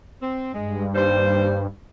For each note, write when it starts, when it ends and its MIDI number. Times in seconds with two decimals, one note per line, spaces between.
0.22 0.51 60
0.54 1.66 43
0.54 0.85 56
0.95 1.61 39
0.95 1.61 55
0.95 1.61 72